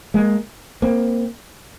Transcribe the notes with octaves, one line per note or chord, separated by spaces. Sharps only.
G#3 A#3
A#3 C4